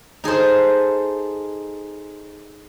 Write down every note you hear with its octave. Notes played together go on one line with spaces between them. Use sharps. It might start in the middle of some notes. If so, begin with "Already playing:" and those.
D#4 G#4 A4 C5